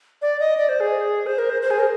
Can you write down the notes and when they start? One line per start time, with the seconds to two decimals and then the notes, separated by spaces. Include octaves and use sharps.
0.22 D5
0.40 D#5
0.57 D5
0.69 C5
0.80 G#4
1.26 C5
1.38 A#4
1.50 C5
1.62 C5
1.70 G#4
1.79 A#4